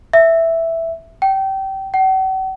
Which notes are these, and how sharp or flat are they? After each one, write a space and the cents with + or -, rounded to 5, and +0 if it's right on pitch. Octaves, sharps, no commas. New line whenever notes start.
E5 +0
G5 -25
F#5 +45